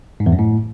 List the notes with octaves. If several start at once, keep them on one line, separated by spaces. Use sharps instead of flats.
G#2
E2
F#2
A2